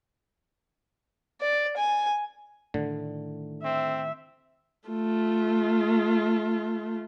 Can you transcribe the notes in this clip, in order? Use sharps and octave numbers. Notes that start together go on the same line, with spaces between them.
D5
G#5
A2 D3 D#3 A3
C4 E5
A3 F4